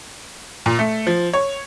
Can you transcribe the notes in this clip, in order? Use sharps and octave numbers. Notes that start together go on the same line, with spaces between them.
A#2
A3
F3
C#5